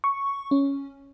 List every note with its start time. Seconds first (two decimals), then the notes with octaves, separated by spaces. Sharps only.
0.04 C#6
0.51 C#4